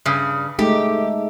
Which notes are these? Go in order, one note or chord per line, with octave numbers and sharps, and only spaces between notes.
G2 C#3
G#3 A3 D#4 G4